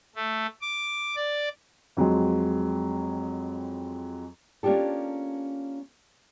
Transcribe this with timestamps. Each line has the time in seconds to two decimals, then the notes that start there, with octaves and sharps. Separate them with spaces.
0.16 A3
0.61 D6
1.16 D5
1.97 F2 F#3 G#3 C4
4.63 A#3 C#4 D4 F4 G4 A4